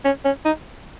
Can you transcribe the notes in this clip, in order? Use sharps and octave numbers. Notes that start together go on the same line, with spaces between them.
C#4
C#4
D#4